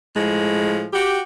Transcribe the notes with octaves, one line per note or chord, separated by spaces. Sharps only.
A2 F3 G#3
F#4 G4